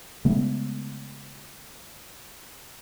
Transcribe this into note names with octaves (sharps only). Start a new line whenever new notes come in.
C#3 G#3 A3 B3